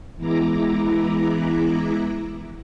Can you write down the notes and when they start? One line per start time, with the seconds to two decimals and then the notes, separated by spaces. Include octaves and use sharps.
0.17 E3 G#3 B3 E4 A#5 D6